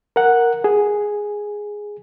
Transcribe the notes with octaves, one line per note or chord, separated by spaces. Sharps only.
A#4 F#5
G#4